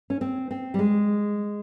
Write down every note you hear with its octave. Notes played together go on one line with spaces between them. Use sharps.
C#4
C4
C4
G3
G#3